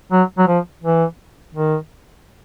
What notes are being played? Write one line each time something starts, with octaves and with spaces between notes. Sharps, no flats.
F#3
F#3
F3
E3
D#3